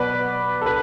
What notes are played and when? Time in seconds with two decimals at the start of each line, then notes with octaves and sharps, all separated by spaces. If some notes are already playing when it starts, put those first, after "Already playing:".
Already playing: B2 F#3 B3 B4 D5
0.61 A4
0.66 D4 B4